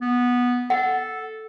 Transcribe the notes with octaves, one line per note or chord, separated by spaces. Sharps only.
B3
A4 F#5